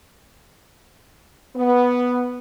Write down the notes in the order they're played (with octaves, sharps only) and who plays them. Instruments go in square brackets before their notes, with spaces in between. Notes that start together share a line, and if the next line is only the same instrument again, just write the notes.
[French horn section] B3